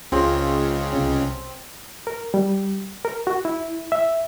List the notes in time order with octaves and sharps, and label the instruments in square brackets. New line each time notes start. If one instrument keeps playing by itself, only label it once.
[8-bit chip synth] C#2 C#3 [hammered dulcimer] C4 [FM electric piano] F4
[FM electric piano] C2 C3 C#4
[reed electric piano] A#4
G3
A#4
F#4
E4
E5